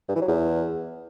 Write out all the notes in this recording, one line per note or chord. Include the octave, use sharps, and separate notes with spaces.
G2
E3
F#3
E2